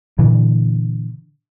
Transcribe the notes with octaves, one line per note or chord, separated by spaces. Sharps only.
A#2 D3 E3